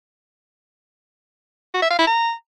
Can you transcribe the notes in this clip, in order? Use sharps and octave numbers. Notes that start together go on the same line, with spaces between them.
F#4
E5
F5
E4
A#5